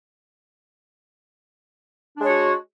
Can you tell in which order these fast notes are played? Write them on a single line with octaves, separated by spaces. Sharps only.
D4 G#3 C#5 F#4